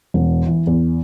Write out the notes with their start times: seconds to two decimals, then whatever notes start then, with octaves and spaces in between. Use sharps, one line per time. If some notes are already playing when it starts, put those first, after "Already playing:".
0.14 E1
0.47 E3
0.67 E2